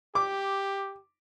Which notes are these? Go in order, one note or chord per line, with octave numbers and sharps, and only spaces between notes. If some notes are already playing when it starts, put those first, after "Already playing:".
G4 D6